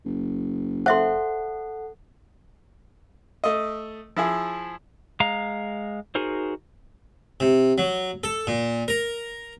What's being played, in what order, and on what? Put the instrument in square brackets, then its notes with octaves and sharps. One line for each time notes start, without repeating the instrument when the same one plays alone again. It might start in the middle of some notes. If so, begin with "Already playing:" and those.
[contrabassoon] F#1
[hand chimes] A4 F#5 [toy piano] C5 E5 C6
[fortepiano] A3 D#5
F3 E4 G#4
[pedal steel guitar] G#3 F5 A#5
D#4 F#4 G#4 A#4 C5
[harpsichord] C3
F#3
A4
A#2
A#4